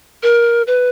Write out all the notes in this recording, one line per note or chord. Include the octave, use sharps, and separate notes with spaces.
A#4
B4